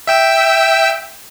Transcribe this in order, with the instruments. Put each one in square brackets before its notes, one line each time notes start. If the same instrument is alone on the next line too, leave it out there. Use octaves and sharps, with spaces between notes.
[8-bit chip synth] E5 G5 E6